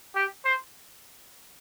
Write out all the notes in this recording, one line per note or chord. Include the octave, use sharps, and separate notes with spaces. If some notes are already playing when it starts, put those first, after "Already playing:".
G4
C5